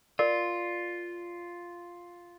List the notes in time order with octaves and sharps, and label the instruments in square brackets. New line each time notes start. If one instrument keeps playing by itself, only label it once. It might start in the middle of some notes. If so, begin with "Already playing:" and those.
[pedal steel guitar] F4 [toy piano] A#4 D5